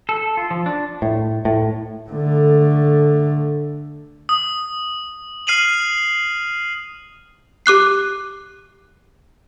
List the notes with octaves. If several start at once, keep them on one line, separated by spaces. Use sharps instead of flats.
A4
F4
F3
D4
A2
A2
D3 A3
D#6
F6 C7 D#7 F7 F#7
G4 D6 F#6 C7